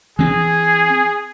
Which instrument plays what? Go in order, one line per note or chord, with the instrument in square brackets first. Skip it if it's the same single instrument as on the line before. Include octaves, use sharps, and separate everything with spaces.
[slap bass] E3 C4 [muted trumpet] G#4